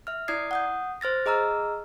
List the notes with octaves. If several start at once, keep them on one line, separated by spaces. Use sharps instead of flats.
E5 F6
E4 D5 D#6 G#6 C7
F#5 D#6 G6
C5 F6 A6 A#6
G#4 D#5 A#5 E6 F6